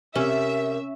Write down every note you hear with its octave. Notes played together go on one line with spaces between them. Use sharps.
C3 C#4 A#4 E5